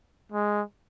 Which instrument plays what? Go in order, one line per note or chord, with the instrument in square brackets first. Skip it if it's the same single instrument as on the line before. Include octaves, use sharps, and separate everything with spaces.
[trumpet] G#3